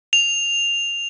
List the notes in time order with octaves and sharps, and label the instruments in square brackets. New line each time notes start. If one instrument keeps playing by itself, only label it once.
[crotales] F7